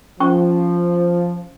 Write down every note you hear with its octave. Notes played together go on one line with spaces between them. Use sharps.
F3 C#4 C#6